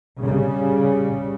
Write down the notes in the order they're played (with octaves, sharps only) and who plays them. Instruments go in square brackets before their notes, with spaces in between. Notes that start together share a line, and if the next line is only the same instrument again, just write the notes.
[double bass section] C#3 G3